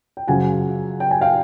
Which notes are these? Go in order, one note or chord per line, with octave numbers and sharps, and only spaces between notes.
G5
F#2 C#3 F3 F#5 G#5
G5
G#5
F5 G5